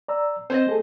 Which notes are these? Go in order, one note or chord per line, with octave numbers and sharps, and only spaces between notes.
D5 A#5 E6
C4 C5 C#5 D#5
A3 G#4 A4